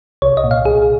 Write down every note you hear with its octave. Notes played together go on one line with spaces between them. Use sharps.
C2 C#5
D#5
A#2
F5
C2 G#4